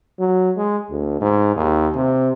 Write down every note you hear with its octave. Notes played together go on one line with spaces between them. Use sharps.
F#3
G#3
D2
G#2
D#2
C3